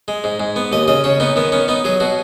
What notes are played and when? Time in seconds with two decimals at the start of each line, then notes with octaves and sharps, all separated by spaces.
0.08 G#3
0.24 G#2
0.40 G#2
0.56 B3
0.72 D#2 D#5
0.88 C#3 D#5
1.04 C#3 C#5
1.20 B3 D#4
1.36 D#3 B3
1.52 B3 C#4
1.68 B3 D#4
1.85 F#3 G#4
2.00 B2 F#4